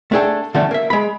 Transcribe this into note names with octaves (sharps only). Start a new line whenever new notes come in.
A3 D4 G#4 A4 G5
D3 F3 G3 A3 C#4
A#3 E5
G#3 B5